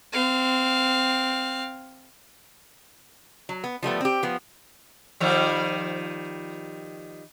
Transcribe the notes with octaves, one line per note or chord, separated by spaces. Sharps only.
C4 F5
F#3
B3
F3 G3 A3 B3
C4 G4
F3 B3
D#3 F3 G3